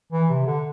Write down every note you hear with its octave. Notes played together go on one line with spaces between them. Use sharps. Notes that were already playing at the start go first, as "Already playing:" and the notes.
E3
C3
D3